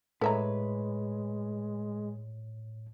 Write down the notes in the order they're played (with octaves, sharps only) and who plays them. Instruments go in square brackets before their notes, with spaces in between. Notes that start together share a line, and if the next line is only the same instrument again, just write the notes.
[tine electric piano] A2 C#5 [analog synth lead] G#3 [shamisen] A4 E5 A#5 [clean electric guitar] B4